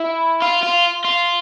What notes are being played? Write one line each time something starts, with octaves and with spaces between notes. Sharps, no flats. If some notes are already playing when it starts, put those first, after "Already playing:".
Already playing: E4
F4
F4
F4